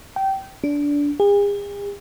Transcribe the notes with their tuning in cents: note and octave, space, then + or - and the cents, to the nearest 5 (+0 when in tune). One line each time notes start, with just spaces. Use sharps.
G5 -20
D4 -20
G#4 -45